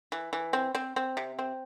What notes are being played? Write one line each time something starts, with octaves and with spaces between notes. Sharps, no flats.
E3
E3
C4
C4
C4
C3
C4